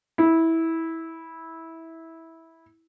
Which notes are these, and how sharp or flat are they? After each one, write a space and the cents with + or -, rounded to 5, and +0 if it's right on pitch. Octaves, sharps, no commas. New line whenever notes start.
E4 -15